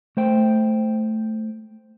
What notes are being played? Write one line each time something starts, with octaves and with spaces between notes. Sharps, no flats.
A3 C5 G5